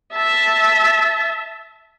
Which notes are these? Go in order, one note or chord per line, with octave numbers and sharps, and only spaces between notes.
E5 A5